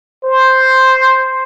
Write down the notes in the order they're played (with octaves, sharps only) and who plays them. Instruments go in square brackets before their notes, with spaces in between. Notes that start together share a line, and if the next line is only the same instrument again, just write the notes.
[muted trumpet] C5